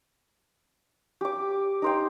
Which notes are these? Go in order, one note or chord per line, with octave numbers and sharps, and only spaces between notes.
G4 D6
D#4 C5 G5